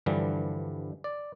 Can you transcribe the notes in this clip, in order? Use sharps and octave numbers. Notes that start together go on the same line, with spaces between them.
G2 D3 E3 F3 G3
D5